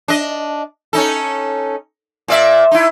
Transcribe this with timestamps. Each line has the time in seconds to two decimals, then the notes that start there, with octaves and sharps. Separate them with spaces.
0.08 D4 D#5
0.93 C#4 D#4 A4
2.28 A#2 D5 E5
2.71 D#4 E4